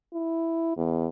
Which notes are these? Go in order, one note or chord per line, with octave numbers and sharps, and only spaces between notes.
E4
E2